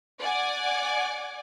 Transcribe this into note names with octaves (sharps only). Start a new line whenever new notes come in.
D5 F#5 G#5 D6